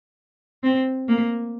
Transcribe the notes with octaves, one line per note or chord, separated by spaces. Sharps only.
C4
A#3